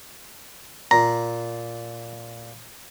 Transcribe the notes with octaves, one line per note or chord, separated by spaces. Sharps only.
A#2 A#5